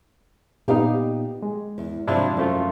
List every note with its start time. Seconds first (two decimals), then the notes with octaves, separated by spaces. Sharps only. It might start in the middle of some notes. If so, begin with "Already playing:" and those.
0.68 A#2 B3 D#4 G4 F5
1.42 G#3
1.78 E2
2.07 C3 F3 F#3 D4 E4 F4
2.37 F#2 F3 A3 F4